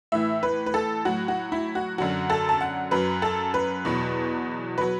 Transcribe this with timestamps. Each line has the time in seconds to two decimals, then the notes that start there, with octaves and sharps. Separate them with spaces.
0.12 A2 E3 E5
0.43 B4
0.66 B4
0.74 A4
1.05 A2 F#3 F#4
1.28 F#4
1.52 E4
1.75 F#4
1.98 F#2 D3 F#3 F#4
2.30 A4
2.49 A5
2.61 F#5
2.91 F#2 F#3 B4
3.22 A4
3.54 B4
3.85 E2 B2 F#3
4.78 F#3 B4